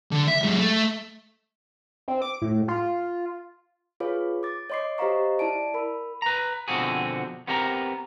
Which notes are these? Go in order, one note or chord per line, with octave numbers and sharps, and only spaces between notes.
D3
E5
F#2 G#3
A3
C4
D6
A2
F4
F4 G#4 B4 C#5 F5
D6 A6
C#5 D#5 C6 D6 C7
G4 C5 D#5 F5 A#5 C#6
E4 D5 A5 D7
A#4 B5
B4 A#5
B2 D3 F3 C4 F#4 G#4
B3 C4 G4 A#4 A5 A#5